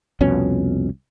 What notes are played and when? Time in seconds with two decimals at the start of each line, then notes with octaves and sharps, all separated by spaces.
0.21 C2 F2 B2 C#4